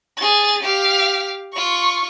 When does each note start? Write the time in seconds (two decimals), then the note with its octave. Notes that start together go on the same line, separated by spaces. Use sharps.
0.18 G#4 A6
0.63 G4 F5
1.54 F4 C#6